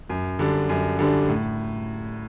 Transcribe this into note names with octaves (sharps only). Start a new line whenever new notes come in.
F#2
D3 G3 D4
F#2
D3 G3 D4
A2